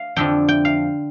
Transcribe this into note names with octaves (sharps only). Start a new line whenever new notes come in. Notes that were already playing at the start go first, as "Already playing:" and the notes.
Already playing: F5
F2 D3 F3 G5
G5
F5